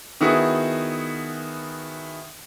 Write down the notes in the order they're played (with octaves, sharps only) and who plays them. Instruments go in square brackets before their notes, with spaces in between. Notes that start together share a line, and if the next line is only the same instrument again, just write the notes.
[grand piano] D#3 B3 E4 F#4 G#4